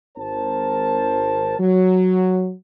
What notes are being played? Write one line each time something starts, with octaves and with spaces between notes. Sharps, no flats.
G#1 A#4 C5 A5
F#3